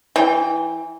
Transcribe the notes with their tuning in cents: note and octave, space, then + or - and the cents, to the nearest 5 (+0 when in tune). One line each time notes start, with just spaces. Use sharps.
E3 +0 G5 +0